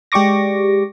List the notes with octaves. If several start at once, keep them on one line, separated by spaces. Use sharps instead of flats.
G#3 G4 D5 C#6 D6 A#6